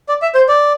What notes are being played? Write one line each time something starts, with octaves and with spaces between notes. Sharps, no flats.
D5
E5
C5
D5